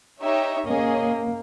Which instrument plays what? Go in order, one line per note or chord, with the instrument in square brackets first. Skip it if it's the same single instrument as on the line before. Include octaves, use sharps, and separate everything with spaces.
[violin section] D#4 G4 C#5 E5
[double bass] A#3 [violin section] C#4 G#4 D#5